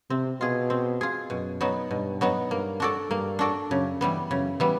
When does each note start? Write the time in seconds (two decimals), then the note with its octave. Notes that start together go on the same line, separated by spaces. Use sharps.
0.10 C3 C4
0.41 B2 F4 G#4
0.70 C4
1.01 F4 G#4
1.30 F#2 B2
1.61 F#3 B3 D#4
1.91 G2 B2
2.21 F#3 B3 D#4
2.51 G2 A#3
2.80 D4 F#4 A4 D5
3.10 G2 A#3
3.39 D4 F#4 A4 D5
3.70 F#2 C#3
4.01 G2 E3 G3 B3
4.30 F#2 C#3
4.60 E3 G3 B3